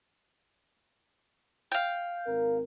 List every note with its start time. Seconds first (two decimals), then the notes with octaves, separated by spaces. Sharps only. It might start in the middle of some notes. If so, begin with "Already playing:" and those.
1.72 F5 G5
2.26 G#1 C4 A#4